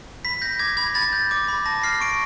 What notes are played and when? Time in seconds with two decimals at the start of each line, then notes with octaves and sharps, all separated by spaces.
0.25 B5 B6
0.42 G6 A#6
0.59 D6 G#6
0.77 B5 G#6
0.95 B5 A6
1.13 G6
1.31 D6
1.48 B5
1.66 A5 A#6
1.83 F6 C7
2.01 C#6 D7